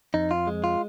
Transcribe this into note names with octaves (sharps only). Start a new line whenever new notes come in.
F2 D#4
F4
G#3
F4